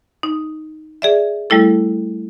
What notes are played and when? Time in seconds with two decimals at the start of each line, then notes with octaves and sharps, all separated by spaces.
0.23 D#4
1.02 G#4 D5 E5
1.50 G3 A3 E4 A4